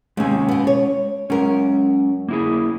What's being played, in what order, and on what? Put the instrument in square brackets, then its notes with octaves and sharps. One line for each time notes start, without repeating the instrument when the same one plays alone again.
[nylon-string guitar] D#2 C3 [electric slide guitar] G#3 C#4 G#5
[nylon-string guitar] B2 B3
C#5
[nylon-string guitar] F#2 A#4 [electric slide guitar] G#3 C#4
[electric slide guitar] A#3 E4 G#4